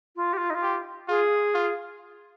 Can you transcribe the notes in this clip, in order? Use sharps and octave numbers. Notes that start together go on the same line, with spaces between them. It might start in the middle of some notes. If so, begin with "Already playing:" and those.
F4
G4
F4
D#4
F4
G4
F4 G#4
F4